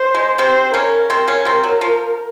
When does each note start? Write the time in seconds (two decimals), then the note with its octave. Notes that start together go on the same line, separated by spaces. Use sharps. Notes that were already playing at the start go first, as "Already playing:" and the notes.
Already playing: C5
0.15 G#3
0.38 C3 C4 C5
0.74 C#3 C#4 A#4
1.10 C3 C4 A#4
1.28 C#3 C#4
1.45 C3 C4
1.63 F#3
1.81 F3